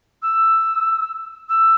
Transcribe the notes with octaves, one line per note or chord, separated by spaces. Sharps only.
E6
E6